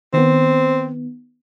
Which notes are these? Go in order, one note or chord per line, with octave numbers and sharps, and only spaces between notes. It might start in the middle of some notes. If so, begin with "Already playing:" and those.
D#3 B3 C4